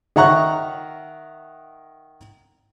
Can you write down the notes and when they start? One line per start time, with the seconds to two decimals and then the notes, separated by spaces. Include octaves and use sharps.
0.16 D#3 E5 F#5 A#5 C#6 F#6